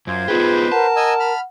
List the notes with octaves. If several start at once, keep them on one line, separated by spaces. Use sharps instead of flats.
F#2 F4 C5 G#6
B3 D#4 F4 G4 G#4 B4 C5
A#4 F#5 A5
D#5 G#5 E6
B5 F6